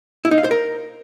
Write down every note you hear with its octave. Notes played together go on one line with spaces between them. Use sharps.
E4
D#4
F5
C5
A#4